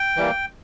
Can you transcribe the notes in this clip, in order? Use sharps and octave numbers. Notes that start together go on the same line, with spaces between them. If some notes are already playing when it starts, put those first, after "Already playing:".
Already playing: G5
E3 G3 A#3